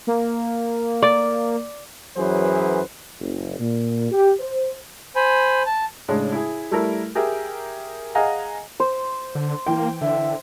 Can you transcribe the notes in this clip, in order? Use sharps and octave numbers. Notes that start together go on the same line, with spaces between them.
A#3
D5
F#2 E3 F#3 G#4 B4 C5
F#1
A#2
G4
C5
C5 G#5 B5
A5
A2 C#3 G#3 D4
E4 G#4
G3 A3 E4 A4 A#4
G4 G#4 A#4 E5 G5
G#4 D#5 F5 F#5 G#5 A#5
C5
D3
E3 A#3 G5
D3 E5